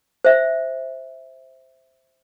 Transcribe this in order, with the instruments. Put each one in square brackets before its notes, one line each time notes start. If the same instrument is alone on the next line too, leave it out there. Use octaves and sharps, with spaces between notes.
[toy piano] C5 E5